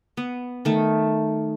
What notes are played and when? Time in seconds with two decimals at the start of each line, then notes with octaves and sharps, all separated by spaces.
0.17 B3
0.65 D#3 A3